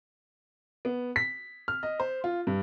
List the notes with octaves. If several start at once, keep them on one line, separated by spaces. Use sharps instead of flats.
B3
B6
F6
D#5
C5
F4
G2